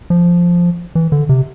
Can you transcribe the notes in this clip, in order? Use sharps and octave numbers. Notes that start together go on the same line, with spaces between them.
F3
E3
D3
C3